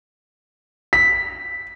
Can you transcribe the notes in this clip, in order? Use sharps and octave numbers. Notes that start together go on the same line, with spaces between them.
B6